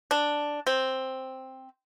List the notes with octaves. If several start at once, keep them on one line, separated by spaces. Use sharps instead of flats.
D4
C4